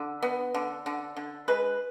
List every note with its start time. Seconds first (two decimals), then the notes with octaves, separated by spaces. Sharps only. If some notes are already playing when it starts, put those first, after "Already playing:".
Already playing: D3
0.22 B3
0.54 D3
0.86 D3
1.16 D3
1.48 G#3 B4